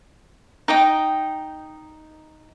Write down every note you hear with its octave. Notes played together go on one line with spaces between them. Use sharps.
D#4 D#5 G5